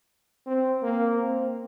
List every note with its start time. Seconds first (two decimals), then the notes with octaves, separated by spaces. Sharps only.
0.47 C4
0.83 A#3
1.19 C4